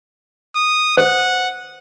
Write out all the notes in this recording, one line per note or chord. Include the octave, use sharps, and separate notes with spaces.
D#6
C5 F#5